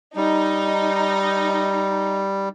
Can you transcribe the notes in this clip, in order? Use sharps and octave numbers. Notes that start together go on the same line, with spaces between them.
G3 D#4